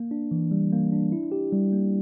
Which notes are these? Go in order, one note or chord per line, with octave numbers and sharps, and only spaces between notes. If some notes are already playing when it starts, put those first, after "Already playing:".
Already playing: A#3
D4
E3
G3
A#3
D4
E4
G4
G3
A#3